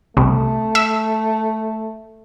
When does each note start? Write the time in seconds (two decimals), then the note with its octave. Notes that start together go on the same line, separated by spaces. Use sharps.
0.17 C2 A3
0.75 E5